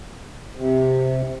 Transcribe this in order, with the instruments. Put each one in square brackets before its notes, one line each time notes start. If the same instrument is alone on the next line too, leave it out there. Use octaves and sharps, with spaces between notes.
[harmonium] C3